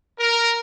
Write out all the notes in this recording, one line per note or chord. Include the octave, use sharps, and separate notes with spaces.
A#4